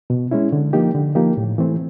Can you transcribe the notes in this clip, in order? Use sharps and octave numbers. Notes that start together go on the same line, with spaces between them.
B2
G#3 C#4 E4
D3
F3 A#3 D#4 G4
D3
F3 A#3 D#4 G4
A2
E3 A3 C4